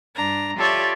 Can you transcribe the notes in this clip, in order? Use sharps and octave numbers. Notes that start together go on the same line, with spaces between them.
G2 D4 A#5
F4 G4 A4 C#5 D5 E5